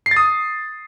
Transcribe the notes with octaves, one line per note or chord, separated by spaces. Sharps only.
C7
A6
D#6